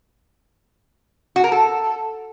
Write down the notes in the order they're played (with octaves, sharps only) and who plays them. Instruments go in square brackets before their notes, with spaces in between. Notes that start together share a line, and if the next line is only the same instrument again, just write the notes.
[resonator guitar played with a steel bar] F#4
A#4
A4